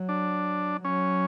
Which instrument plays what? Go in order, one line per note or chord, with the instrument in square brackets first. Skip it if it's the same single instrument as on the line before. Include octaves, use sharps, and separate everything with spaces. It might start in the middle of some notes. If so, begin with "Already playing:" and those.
Already playing: [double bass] F#3
[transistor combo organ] D4
[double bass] F#3 [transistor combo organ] C#4